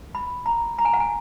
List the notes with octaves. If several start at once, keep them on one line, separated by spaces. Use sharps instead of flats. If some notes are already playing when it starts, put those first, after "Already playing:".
B5
A#5
A#5
G#5
F#5
G#5